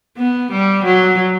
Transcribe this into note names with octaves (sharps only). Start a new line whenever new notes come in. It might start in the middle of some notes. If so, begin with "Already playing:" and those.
B3
G3
F#3